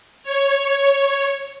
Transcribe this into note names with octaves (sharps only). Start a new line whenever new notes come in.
C#5